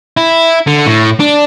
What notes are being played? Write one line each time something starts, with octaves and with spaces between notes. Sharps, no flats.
E4
D3
A2
D4